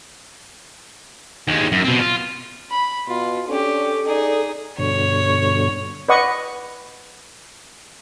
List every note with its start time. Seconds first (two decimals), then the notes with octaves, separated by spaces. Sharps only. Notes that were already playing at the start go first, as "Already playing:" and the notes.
1.48 D#2 G#3
1.72 F#2
1.84 B2 C4
2.00 F4
2.71 B5
3.08 B2 F4
3.48 C#4 D4 G4 A4
4.07 D#4 G#4 D5
4.78 G2 B2 D3 C#5
6.09 B4 D5 D#5 F#5 C#6 D#6